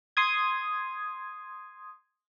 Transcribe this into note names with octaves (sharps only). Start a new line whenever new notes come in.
C6 D#6 G#6